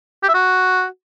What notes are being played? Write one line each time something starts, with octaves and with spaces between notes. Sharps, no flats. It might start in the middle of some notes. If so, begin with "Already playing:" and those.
G4
E5
F#4